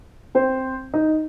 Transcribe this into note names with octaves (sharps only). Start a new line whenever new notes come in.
C4 C5
D#4